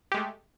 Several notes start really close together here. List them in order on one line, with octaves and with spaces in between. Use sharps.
G4 G#3 A3